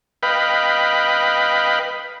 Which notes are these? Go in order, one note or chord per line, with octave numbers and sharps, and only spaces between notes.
B4 D#5 F5 G5 B5